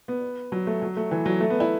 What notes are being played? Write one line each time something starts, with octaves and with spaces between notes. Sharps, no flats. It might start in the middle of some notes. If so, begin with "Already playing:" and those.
B3
F#3
A3
F#3
A3
E3
F#3
A3
B3
E4